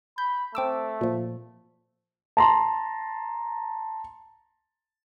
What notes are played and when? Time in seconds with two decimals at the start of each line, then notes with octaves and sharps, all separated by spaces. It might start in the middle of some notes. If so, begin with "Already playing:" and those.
0.18 B5 G6
0.55 A3 C4 D6 E6
1.01 A#2 F3
2.37 A5 A#5 C6